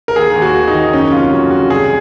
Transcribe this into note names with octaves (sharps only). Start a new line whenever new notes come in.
A#4
D#2 G#4
D#2
F#4
D#2
D#4
D#3
F#1 C#4
C3 F4
F2 F#4
C3 F#4
C2 G#4